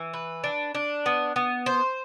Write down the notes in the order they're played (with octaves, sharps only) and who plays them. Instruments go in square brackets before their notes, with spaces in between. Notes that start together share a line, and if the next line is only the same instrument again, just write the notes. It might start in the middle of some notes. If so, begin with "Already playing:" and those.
Already playing: [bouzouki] E3
B4
D4
D4
B3
B3
C5